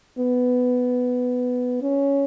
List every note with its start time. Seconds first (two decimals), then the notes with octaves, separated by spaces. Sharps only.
0.19 B3
1.82 C#4